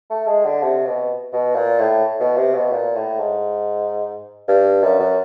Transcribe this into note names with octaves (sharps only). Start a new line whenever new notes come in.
A3
G#3
D3
C3
B2
B2
A#2
A2
B2
C3
B2
A#2
A2
G#2
G2
F#2
F#2